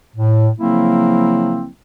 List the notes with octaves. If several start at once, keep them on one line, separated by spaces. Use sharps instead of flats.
A2
C#3 F3 F#3 A#3 C4 E4